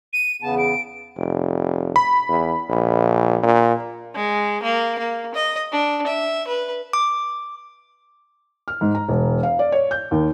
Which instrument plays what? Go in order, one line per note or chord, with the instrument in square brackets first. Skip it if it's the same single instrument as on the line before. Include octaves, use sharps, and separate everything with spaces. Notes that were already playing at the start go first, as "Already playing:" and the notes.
[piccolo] D#7
[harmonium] E2 C#3 B3 [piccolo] A5
[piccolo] D7
[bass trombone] F1
[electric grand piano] B5
[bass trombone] E2
A#1
A#2
[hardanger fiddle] G#3
A#3
A#3
D#5
D4
E5
B4
[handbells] D6
[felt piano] F6
G#2
A#5
E1
F5
D5
C#5
G6
D#2